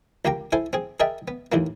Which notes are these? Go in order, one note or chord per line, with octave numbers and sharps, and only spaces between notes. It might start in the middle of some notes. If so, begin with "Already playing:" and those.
C#2 A#3 G4 G5 A#5
E4 A4 C5 G#5
C4 G#4
G#4 A#4 D#5 E5 G5 A5
B3
D#2 A2 E3 A#3